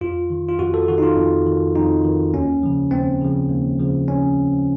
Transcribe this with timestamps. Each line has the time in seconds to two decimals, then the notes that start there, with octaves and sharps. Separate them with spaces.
0.01 F2 F4
0.30 D#3
0.49 F4
0.59 F2 F#4
0.74 A4
0.88 D#3 F#4
0.98 D#4
1.03 F4
1.17 F2
1.47 D#3
1.75 F2 D#4
2.04 D#3
2.34 D#2 C#4
2.63 C#3 F3
2.91 D#2 C4
3.21 C#3 F3
3.49 D#2
3.79 C#3 F3
4.08 C#4